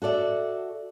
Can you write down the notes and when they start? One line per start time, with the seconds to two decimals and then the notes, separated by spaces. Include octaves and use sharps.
0.02 F#4 A4 D5 E5